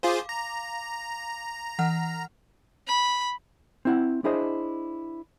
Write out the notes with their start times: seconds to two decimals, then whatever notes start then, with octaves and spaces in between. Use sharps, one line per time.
0.03 F4 G#4 C5 F5 D6
0.29 A#5
1.79 E3 F#5 F6
2.88 B5
3.85 C4 E4 F#5
4.24 D4 E4 G#4 C5 D#5